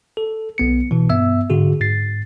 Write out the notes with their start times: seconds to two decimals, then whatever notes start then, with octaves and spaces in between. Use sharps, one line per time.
0.17 A4
0.58 B1 B3 C#7
0.91 B2 E3
1.09 G2 B3 E5 E6
1.50 G#2 D3 F#4 G#4
1.81 G#2 A6 C7